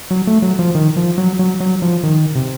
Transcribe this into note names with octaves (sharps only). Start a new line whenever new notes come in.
F#3
A3
F#3
F3
D#3
F3
F#3
F#3
F#3
F3
D#3
C3